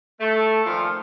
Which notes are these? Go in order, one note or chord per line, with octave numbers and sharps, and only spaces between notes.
A3
A#2 D#3 F3 F4